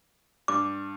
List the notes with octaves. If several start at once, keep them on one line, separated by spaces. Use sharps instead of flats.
G2 D6